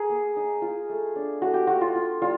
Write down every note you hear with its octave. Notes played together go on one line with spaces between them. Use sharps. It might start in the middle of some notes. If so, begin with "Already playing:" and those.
Already playing: G#4 A#4
A#3
D#4
F4
A3
D4
A3 F#4
G4
F4 F#4
F4
F4
G3 F4